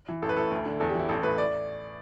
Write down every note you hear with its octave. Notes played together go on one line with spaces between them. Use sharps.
E3
A1 A4
B4
A2 A4
D2
D3
E2 A4
G4
E3 E4
A1 A4
A2 B4
D5